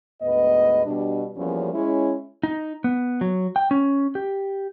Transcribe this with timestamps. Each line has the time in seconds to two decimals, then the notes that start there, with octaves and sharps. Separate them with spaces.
0.22 D2 G#2 B3 B4 D#5
0.85 B2 G3 D4
1.36 E2 F3 G3 A#3 C#4
1.73 G#3 C#4 E4
2.43 D#4
2.84 B3
3.21 F#3
3.56 G5
3.71 C#4
4.15 G4